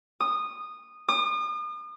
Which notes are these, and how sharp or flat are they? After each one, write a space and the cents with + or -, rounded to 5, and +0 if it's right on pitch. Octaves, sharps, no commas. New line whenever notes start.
D#6 -15
D#6 -40